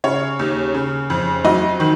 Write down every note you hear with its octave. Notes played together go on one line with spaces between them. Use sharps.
C#3 C#5
D#2
C#3
F2
F#3 D#5
D#3